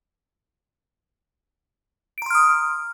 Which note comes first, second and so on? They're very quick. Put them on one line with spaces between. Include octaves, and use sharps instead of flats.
D7 A#5 C6 F6 D#6